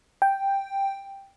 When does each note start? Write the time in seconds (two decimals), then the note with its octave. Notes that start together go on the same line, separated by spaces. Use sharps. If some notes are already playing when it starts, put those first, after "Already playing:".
0.22 G5